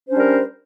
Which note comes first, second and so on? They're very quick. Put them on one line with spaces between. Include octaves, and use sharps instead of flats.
C5 C#4 D4 G3 A#4